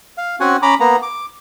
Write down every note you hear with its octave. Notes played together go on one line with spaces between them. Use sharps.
F5
C4 C#4 F#4 F#5 G#5
C#4 A#5 B5 D6
A#3 B3 A#5
D6